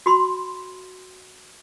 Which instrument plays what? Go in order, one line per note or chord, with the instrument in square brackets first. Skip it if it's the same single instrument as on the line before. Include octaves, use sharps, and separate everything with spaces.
[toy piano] F#4 B5 C6